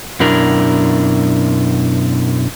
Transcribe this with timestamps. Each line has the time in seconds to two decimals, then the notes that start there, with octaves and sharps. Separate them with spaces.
0.20 F#2 B2 D4 E4 A#4